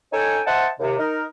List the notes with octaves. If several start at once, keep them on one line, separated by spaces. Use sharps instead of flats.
C#4 D#4 A4 C#5 G5 G#5
C5 D#5 E5 F#5 A5
D#2 C3
D#4 A#4